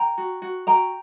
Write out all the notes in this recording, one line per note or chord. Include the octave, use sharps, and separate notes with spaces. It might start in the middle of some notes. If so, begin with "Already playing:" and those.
Already playing: G5 A#5
F#4
F#4
F#4 G5 A#5